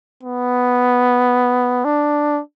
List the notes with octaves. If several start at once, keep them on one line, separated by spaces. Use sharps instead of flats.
B3
D4